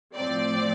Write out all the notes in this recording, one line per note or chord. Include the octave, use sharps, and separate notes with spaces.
A2 F3 C4 D5